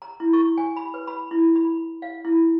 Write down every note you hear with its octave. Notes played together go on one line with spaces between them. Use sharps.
A#5
E4
C#6
G#5
B5
B4
B5
E4
B5
F5
E4